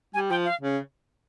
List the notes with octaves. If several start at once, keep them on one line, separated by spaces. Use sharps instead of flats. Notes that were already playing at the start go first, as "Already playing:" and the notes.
G3 G#5
F3 G5
F5
C#3